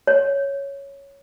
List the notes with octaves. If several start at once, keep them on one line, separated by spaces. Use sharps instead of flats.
C#5